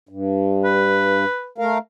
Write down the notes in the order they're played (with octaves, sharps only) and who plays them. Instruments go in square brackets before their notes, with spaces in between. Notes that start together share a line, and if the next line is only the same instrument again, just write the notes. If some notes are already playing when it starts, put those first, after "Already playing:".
[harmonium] G2
[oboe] B4
[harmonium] A3 A#4 F5